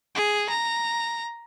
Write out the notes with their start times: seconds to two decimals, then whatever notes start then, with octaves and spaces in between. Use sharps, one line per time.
0.15 G#4
0.49 A#5